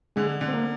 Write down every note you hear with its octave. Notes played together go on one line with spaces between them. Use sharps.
D3 G#3
D3
C4
A#3